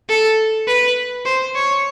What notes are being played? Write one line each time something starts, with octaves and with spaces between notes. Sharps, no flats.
A4
B4
C5
C#5